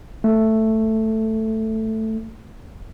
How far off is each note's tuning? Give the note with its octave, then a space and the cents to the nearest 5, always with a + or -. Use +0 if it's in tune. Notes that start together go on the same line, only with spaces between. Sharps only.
A3 +5